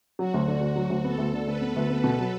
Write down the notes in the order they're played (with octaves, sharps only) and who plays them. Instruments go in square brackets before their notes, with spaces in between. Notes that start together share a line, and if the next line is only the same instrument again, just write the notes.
[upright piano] F#3 [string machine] F#4
[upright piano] D2
D3
D2
F#3
D2
[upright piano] B3 [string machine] A4
[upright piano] D2
D3
[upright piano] D2 [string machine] B4
[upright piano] B3
D2
B3
B2
F#3